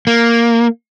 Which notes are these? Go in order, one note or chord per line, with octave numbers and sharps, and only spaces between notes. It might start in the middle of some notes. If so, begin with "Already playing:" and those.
A#3